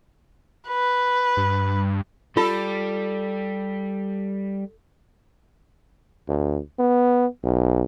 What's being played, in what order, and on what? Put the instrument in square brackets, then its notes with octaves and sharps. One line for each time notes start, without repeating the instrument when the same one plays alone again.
[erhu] B4
[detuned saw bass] G2
[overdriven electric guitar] G3 [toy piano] F4 [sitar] A4
[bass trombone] D2
B3
B1